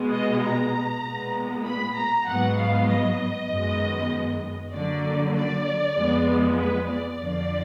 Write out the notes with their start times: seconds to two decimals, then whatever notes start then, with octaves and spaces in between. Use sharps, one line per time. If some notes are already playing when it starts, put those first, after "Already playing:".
Already playing: B2 G#3 B3
0.11 D#5
0.42 A#5
1.03 A#2 G#3 B3
1.66 B5
1.96 A#5
2.27 G#2 F#3 B3 F#5
2.58 F5
2.88 D#5
3.50 F#2 D#3 G#3 B3
4.73 D3 F#3 A#3 D5
5.35 D5
5.97 F2 F3 G#3 B3
6.58 B4
6.89 D5
7.20 F2 D3 F3